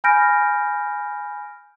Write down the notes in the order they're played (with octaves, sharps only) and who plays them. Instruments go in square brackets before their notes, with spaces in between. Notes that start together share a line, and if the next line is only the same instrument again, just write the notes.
[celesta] G#5 B5 F6 G6 A#6 D7